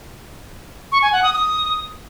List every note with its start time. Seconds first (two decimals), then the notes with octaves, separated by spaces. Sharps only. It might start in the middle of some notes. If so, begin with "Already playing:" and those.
0.92 C#6
1.02 G#5
1.12 F#5
1.23 D#6
1.33 D#6